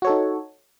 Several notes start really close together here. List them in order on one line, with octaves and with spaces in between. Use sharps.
F#4 C#5 A4 D#4